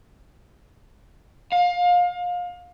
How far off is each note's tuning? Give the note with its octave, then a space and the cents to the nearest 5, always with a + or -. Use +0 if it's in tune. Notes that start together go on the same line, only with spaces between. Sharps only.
F5 +30